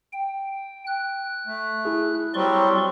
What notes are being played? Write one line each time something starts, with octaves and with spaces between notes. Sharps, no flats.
G5
F#6
A3
E4 G#4
F#3 G3 C4 D5 C6 C#6